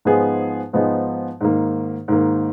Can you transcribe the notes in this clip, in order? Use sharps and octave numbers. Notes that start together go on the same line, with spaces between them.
G#2 F3 B3 D#4 G#4
G#2 F3 B3 D#4 G#4
G#2 D#3 A#3
G#2 D#3 A#3